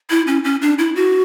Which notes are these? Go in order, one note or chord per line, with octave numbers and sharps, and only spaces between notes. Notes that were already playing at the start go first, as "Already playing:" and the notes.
E4
C#4
C#4
D4
E4
F#4